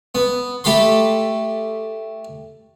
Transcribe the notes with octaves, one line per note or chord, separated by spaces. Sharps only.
B3
A3 G4 A4 B5 C6